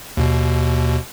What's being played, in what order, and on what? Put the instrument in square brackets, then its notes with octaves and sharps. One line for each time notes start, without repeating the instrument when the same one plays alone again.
[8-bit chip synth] D#2 B2